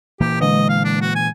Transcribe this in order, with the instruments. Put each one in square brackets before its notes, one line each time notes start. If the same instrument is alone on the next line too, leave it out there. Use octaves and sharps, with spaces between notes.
[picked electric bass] A#2 E3 A#3 [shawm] G4
[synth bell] D3 G#3 [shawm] D#5
[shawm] F5
D4
F#4
G#5